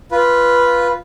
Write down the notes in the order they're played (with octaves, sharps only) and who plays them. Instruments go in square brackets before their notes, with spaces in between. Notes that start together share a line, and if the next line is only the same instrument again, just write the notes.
[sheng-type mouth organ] F4 B4